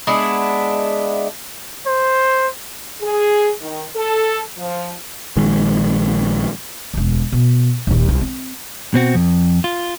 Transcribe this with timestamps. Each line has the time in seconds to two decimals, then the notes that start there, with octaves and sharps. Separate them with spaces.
0.07 G#3 B3 D4 E4
1.87 C5
3.01 G#4
3.60 D#3
3.95 A4
4.58 F3
5.36 A#1 D#3 G#3
6.94 E1 D2
7.32 B2
7.87 D#1 D#2
8.09 C2 F4
8.21 C4
8.94 B2 C4 F#4
9.15 F2
9.64 F4